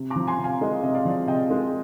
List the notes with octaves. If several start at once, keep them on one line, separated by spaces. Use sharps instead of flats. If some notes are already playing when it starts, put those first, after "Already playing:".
Already playing: C3
A#5 D6
F3
G#5 C6
C3
F5 G#5
G#3 D#5
C3 D#5
D5 F5
F3
C3 D#5 G5
G#3